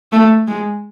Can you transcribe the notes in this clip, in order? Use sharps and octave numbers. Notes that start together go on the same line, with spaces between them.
A3
G#3